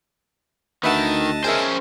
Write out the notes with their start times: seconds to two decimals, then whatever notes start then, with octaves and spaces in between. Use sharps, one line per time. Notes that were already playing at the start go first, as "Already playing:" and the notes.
0.84 D2 D#3 B4 D#5 E5 F#5 A5
1.44 C#4 G#4 A#4 C5 E5